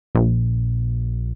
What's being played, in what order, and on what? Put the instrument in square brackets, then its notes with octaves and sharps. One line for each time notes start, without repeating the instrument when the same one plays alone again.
[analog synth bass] A#1